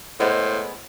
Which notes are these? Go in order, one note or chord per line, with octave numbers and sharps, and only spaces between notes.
A2 G#3 B3 C5